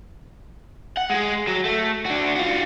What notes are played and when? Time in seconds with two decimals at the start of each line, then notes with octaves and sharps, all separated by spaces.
0.97 F#5
1.10 G#3 G#4
1.47 F#3
1.65 A3
2.06 D3 F#4
2.36 F4 F#4